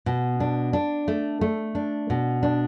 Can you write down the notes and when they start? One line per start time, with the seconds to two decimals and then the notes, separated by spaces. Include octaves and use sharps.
0.06 B2
0.40 D4
0.73 D4
1.08 A3
1.41 A3
1.75 D4
2.10 B2
2.43 D4